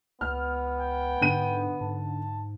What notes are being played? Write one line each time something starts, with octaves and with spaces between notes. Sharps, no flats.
C#2 B3 F6
G5
G#2 D3 D#7
G#2 A5